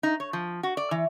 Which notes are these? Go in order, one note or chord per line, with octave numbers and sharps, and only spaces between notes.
D#4
C#5
F3
F#4
D5
E3